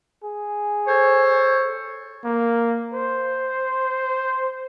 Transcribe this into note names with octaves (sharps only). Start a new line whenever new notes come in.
G#4
A4 C5 C#5
A#3
C5